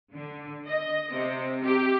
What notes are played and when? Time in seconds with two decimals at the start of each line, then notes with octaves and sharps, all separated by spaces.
0.14 D3
0.68 D#5
1.13 C3
1.64 G4